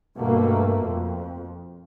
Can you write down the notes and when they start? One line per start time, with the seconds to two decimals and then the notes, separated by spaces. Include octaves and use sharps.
0.18 G2 B2 A3 A#3
0.83 F2